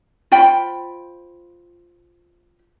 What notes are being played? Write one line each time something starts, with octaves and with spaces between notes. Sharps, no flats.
F4 C5 G5 B5